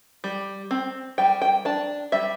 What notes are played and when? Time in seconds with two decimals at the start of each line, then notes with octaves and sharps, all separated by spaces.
0.24 G3
0.71 C4
1.18 G3 G5
1.42 G5
1.65 D4 A5
2.12 G3 E5